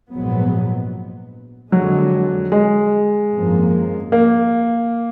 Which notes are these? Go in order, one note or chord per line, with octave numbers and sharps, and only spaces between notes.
A#1 G#2 F#3 B3
F2 D3 F#3 G#3
G#3
G#1 F#2 F3 A#3
A#3